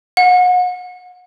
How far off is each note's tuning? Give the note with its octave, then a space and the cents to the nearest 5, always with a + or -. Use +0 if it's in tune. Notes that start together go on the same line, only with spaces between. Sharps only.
F#5 -35